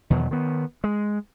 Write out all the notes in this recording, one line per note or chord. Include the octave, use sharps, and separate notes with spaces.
E2 B2 D#3 F#3
D#3 B3
G#3